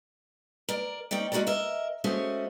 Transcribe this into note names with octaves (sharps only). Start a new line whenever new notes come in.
A#4 D5
C4 C#4 D#4 D5 G5
G#3 C#4 F#4 G#4 A#4 D5
A#4 D#5 E5
G#3 A3 C#4 F#4 G#4 C5